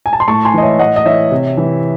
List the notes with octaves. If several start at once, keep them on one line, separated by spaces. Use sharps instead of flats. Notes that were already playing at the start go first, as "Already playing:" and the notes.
G#5
A5
C6
A2 A5 C#6
G#5 C6
E3 D#5
C#5 E5
A2 D#5 F#5
D#5
E3 C#5 E5
C3
E3